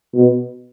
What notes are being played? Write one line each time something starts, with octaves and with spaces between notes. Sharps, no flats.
B2